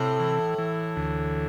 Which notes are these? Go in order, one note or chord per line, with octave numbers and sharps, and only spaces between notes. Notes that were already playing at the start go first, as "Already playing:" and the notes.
Already playing: A2 C3
E3
E3
D2